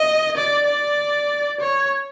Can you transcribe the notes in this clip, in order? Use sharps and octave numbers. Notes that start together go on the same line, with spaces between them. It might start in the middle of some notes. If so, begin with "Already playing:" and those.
Already playing: D#5
D5
D5
C#5